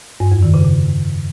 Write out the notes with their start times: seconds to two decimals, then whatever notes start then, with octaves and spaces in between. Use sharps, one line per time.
0.20 G2
0.31 F2
0.43 D#3
0.54 C#3
0.65 C#3